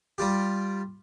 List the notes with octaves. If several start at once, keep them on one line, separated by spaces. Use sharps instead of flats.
G3 F4 G4